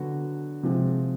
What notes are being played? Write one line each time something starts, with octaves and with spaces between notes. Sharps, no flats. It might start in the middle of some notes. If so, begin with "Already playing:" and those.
Already playing: D3 F#3 B3 F#4
C3 F3 G#3